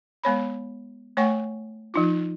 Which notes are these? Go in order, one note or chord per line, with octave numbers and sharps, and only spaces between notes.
G#3 B3 C#5 B5
A3 C#5 F#5 G#5 C#6
F3 D#4 F4